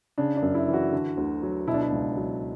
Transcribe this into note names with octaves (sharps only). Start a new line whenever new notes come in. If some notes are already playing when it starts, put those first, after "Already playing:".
C#3 D4
D4
F#2
E4
E3
F#4
D3
D2
F#3
B2 E4
D4
E4
C#2
F#3